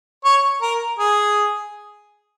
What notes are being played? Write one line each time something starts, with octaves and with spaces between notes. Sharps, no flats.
C#5
A#4
G#4